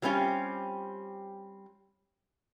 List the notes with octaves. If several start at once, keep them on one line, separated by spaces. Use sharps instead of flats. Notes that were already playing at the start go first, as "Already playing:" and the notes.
F#3 G3 C4 C#4 F4 G4